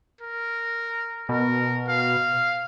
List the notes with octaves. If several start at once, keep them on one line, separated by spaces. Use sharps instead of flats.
A#4
B2 A#4
F5